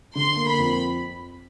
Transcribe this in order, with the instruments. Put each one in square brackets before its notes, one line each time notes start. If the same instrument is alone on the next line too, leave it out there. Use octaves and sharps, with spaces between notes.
[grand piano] D3 [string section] C6
[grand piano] A#3
[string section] B5
[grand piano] F2